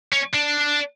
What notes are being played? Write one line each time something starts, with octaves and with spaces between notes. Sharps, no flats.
C#4
D4